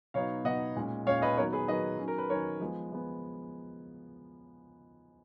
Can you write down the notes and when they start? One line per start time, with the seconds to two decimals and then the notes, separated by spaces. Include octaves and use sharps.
0.14 B2 F#3 B3 D#4 C#5 F5
0.45 B2 F#3 B3 D#4 D#5 F#5
0.76 A#2 G#3 C#4
1.07 A#2 G#3 C#4 C#5 F5
1.22 B4 D#5
1.37 D#3 F#3 B3 A#4 C#5
1.53 G#4 B4
1.68 D#3 F#3 B3 B4 D#5
1.99 D#3 F#3 C#4
2.08 A#4
2.18 B4
2.29 D#3 F#3 C#4 A#4 C#5
2.60 F3 G#3 B3
2.91 F3 G#3 B3